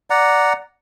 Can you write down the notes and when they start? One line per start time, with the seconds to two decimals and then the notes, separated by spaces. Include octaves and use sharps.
0.10 D5 F#5 A#5